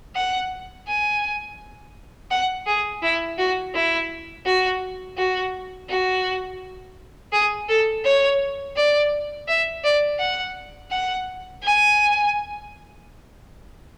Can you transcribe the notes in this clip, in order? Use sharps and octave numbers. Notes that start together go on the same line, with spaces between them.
F#5
G#5
F#5
G#4
E4
F#4
E4
F#4
F#4
F#4
G#4
A4
C#5
D5
E5
D5
F#5
F#5
G#5